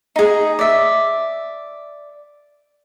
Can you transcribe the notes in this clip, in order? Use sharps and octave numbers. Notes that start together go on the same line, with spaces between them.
D#4 G#4
D5 E5